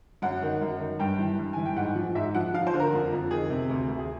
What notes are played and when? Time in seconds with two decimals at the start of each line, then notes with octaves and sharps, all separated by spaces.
0.22 F#2 F#5
0.42 D#3
0.61 F#2
0.80 D#3
0.99 G2 G5
1.19 E3
1.38 G2
1.53 E3 G#5
1.65 G5
1.76 G#2 F#5
1.95 F3
2.15 G#2 E5
2.35 F3 F#5
2.54 F3 F5
2.67 C5
2.73 D3
2.80 A#4
2.93 F2
3.12 F2
3.31 D#3 G#4
3.50 C3
3.69 D2
3.88 D2
3.99 G#4